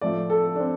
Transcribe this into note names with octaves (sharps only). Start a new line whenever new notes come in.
A2 F3 A3 D5
A4
D4
C4